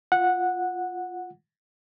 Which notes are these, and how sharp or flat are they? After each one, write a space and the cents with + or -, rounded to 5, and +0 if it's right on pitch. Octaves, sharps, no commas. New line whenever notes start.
F4 +0 F#5 -10